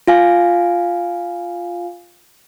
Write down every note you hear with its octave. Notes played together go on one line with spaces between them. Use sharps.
F4 F5 G#5